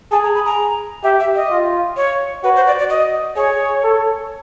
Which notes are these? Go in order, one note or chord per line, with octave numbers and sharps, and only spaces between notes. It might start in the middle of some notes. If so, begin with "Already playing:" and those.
G#4 A5
A#5
B5
A#5
G4 E5
E5
D#5
F4
C#5
F#4 B4
C5
D5
D5
D#5
G#4 C#5
A4